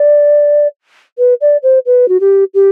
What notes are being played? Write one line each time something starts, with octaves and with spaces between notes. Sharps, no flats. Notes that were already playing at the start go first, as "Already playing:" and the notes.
Already playing: D5
B4
D5
C5
B4
F#4
G4
G4